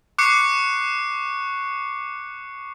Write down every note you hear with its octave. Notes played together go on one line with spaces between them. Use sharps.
C#6 D6 F#6 C7 C#7